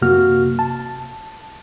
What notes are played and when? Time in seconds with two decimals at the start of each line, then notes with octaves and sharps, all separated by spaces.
0.02 F#2 C3 A#3 F#4 F6
0.59 A5